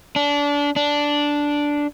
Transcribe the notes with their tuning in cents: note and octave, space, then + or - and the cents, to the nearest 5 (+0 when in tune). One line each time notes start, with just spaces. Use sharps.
D4 -25
D4 -5